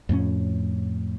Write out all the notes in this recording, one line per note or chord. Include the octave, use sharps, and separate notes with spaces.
F2 A2 A#3 C#4